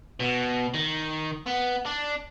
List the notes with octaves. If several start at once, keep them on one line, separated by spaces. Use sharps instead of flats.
B2
D#3
B3
D4